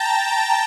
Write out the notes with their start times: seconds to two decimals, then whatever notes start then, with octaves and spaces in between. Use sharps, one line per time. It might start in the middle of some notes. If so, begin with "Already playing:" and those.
Already playing: G5 A5 A#5